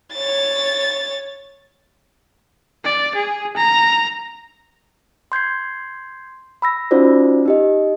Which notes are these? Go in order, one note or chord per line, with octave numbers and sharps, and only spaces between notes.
C#5 A6
D5
G#4
A#5
C6 G6 G#6 C7
B5 E6 A#6
C#4 D#4 F4 F#4 C5 D5
D#4 G4 D#5